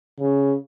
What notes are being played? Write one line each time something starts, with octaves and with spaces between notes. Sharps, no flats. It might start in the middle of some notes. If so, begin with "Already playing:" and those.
C#3